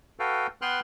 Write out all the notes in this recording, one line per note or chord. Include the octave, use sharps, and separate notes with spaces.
F#4 A4 B4 F5 G5
B3 B4 G5 C6 F6 F#6